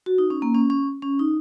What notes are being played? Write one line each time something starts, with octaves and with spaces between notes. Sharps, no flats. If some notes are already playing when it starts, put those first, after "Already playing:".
F#4
D#4
C#4
A#3
C#4
C#4
C#4
D#4